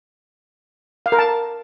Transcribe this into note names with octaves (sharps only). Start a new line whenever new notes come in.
F5
A#4
A5